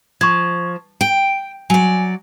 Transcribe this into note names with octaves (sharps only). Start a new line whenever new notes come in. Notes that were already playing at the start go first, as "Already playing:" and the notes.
F3 C#6 G#6
G5 D7
F#3 D5 G#5